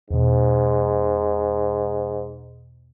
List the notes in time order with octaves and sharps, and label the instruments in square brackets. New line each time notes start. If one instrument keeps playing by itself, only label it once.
[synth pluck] E2 B2 [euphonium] G#2